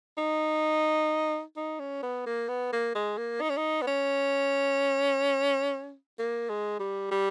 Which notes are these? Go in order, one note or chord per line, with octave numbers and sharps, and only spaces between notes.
D#4
D#4
C#4
B3
A#3
B3
A#3
G#3
A#3
D#4
C#4
D#4
B3
C#4
A#3
G#3
G3
G3